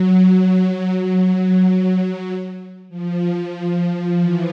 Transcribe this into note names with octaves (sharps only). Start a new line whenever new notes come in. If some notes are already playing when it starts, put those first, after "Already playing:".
Already playing: F#3
F#3
F3
E3